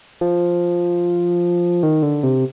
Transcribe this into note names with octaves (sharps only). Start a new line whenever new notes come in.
F3
D#3
D3
C3